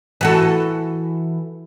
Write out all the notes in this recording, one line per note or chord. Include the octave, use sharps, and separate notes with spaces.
E3 F#4 A4